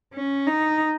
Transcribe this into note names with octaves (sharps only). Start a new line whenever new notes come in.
C#4
D#4